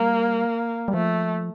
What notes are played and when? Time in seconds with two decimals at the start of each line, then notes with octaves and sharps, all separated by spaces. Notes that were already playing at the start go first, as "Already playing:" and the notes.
Already playing: G3 A#3
0.88 G3
0.93 F3 A3